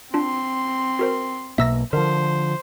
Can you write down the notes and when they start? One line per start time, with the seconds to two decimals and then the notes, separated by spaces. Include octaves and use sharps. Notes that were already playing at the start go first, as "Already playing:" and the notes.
0.14 C4 D4 F4 C6
0.99 F#4 A#4 C5
1.58 B1 B2 A#3 E5 E6 A#6
1.93 D3 F3 A#4 C5